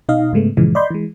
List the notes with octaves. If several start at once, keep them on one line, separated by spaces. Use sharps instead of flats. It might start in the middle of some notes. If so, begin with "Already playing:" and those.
B2 D#4 D#5 F5
G#2 C#3 G#3 A3 B3
G2 A#2 C#3 E3 F3 G#3
D5 D#5 B5 C6 G6
E3 G#3